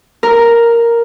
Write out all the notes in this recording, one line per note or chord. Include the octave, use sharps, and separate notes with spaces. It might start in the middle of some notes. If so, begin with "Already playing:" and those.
A#4